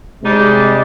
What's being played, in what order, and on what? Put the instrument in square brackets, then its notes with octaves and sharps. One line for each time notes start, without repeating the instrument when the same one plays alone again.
[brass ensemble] C3 G#3 [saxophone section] G3 D4 D#4